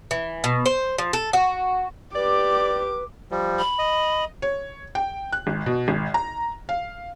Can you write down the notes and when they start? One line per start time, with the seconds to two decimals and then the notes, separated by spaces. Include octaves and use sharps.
0.11 E3
0.44 B2
0.66 C5
0.98 F3
1.13 A4
1.33 F#4
2.15 G4 B4 D5 D6
3.31 F3 G3
3.59 B5
3.79 D#5
4.42 C#5
4.95 G5
5.33 F#6
5.47 G#1
5.66 B2
5.88 G#1
6.14 A#5
6.69 F5